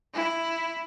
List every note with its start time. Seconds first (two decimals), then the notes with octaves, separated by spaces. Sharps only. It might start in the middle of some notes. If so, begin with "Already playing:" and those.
0.14 E4